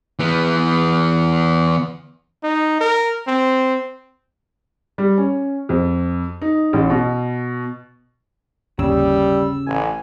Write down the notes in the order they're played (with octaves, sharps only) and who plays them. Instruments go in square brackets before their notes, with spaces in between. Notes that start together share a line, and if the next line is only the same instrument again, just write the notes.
[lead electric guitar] E3 B3
[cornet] D#4
A#4
C4
[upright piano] G3
C#4
F2
D#4
A1
B2
[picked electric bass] G1 D#2 A2 [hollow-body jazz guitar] C#3 [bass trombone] G3 [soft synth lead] E6
[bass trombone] A1 [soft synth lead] G#5